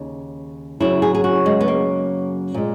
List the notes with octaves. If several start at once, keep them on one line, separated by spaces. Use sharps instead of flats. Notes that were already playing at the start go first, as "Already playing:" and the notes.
Already playing: D#2 C#3
F#2 C#3 F#3 E4
G#4
G#4
F#4
G#3
B3
A#3
A#2 G#3